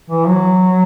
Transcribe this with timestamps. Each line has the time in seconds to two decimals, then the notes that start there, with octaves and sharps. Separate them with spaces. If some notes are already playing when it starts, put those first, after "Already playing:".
0.10 E3
0.27 F#3